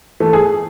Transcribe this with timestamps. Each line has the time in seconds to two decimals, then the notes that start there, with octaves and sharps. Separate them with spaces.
0.20 E3 A3
0.33 G#4